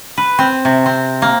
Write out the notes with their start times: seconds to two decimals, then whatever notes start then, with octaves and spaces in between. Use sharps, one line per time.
0.17 B4
0.39 C4
0.65 C3
0.86 C4
1.22 A#3